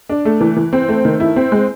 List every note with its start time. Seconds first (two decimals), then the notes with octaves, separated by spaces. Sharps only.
0.10 D4
0.25 A3
0.41 E3
0.56 E3
0.73 C4
0.89 A3
1.05 D#3
1.20 E4
1.36 C4
1.52 G#3